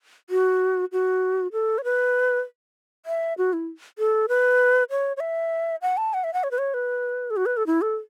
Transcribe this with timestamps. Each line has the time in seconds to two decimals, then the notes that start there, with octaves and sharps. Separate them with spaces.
0.30 F#4
0.92 F#4
1.52 A4
1.78 C#5
1.84 B4
3.06 E5
3.38 F#4
3.53 E4
3.99 A4
4.29 B4
4.90 C#5
5.17 C#5
5.21 E5
5.82 F#5
5.97 A5
6.14 F#5
6.24 E5
6.34 F#5
6.44 C#5
6.51 B4
6.58 C#5
6.74 B4
7.30 A4
7.37 F#4
7.46 B4
7.57 A4
7.67 E4
7.82 A4